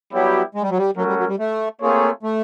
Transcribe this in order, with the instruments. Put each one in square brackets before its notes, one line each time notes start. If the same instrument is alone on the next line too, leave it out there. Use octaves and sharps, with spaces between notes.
[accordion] F#3 [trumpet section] G3 B3 E4 G4
[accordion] G#3
G3
F#3
G3
[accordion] F#3 [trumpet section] A3 C#4 F#4 A#4
[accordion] G3
F#3
G3
A3
[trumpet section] A3 C4 F4 G#4 C#5 [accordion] A#3
[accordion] A3